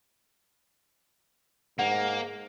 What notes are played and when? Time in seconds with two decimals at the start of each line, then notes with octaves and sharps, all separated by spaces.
1.79 G#2 A#3 F#5